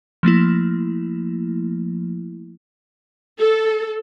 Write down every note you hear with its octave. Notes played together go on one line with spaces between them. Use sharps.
F3 A3 A#3 E4
A4